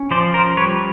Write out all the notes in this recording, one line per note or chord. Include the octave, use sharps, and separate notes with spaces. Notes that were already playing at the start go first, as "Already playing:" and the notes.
Already playing: C#4
F3 C5 D5
A#4 C5
G3 B4 C#5